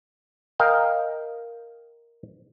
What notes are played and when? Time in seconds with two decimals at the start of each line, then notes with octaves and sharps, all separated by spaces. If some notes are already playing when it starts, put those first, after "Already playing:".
0.59 A#4 D#5 F5 G5